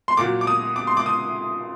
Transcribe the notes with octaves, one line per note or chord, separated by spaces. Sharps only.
C6
A#2 F#3 D6
D6
D#6
D6
C6
D6
D#6